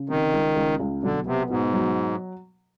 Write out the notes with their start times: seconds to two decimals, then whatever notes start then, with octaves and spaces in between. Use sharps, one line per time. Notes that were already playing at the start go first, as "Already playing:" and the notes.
Already playing: C#3
0.09 C3 D#3
0.33 C#2
0.56 C#2
0.80 C#2
1.03 B1 D3
1.26 C3 B3
1.50 G#2 B2
1.73 F#3